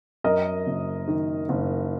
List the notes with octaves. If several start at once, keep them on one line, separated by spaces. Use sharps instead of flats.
F#2 A#4 D#5
F#1
D#3
F#1